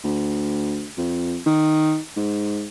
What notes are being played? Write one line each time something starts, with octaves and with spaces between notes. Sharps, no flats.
D2
F2
D#3
G#2